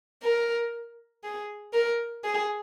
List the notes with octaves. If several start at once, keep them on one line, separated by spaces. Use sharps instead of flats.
A#4
G#4
A#4
G#4